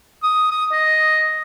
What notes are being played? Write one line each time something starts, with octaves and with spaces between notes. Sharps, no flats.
D#6
D#6
D#5